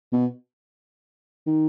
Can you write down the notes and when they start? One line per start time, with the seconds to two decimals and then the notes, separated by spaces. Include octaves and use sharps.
0.12 B2
1.47 D#3